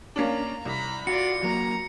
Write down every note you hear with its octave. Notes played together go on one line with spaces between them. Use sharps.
A#3 C#4 D4 A#5
C2 A#5 B5
F4 F#4 D5 C#7
F#3 A#3 A#5